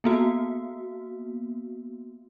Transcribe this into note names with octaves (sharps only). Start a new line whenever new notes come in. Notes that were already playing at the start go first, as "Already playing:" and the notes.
A#3 B3 F#4